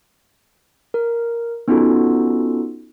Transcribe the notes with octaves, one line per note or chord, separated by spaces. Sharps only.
A#4
B3 C#4 D#4 F4 F#4 A4